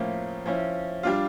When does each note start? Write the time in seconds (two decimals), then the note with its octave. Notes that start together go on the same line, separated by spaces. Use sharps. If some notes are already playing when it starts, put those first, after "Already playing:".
Already playing: A2 F3 A#3 C#4
0.46 F3 C#4 E4
1.03 G3 D4 F4